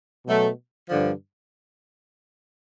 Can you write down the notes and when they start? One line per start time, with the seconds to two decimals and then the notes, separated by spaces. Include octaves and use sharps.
0.26 B2 F#3 A3
0.90 G2 D3 F3